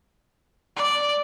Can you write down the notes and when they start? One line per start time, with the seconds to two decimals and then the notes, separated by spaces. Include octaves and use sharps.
0.77 D5